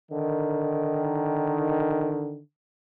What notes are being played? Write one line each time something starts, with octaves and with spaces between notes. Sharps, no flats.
D3 D#3